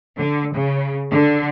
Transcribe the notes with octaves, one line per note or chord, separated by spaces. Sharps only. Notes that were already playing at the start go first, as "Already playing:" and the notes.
D3
C#3
D3